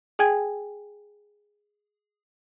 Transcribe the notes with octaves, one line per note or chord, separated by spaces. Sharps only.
G#4 G5 G#5 G#6